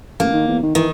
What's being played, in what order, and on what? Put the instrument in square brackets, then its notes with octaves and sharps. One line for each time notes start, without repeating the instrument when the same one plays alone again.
[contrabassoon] A1 [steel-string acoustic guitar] A#3
[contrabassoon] D#3
E2
D#3
[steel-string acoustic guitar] D#3 [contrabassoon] E3